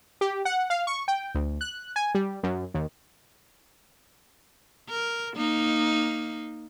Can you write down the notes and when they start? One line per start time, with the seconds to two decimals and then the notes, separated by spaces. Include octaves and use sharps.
0.21 G4
0.45 F#5
0.70 F5
0.87 C#6
1.08 G5
1.35 D2
1.61 F#6
1.96 G#5
2.14 G3
2.43 F#2
2.74 D#2
4.89 A#4
5.36 A#3 D#4